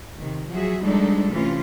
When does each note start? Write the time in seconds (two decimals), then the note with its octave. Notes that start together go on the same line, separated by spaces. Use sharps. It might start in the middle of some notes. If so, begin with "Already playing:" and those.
0.19 C3 D#3
0.49 F3 F#3 F#4 G#4 E5
0.81 F3 G3 G#3 D4 D#4 A4
1.32 C3 E3 A3 C#4 F4